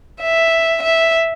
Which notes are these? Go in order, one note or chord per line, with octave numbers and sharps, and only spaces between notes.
E5
E5